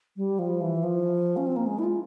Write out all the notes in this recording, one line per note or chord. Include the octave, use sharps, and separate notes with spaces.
G3
F3
E3
F3
C#4
C4
A#3
G#3
E4
F4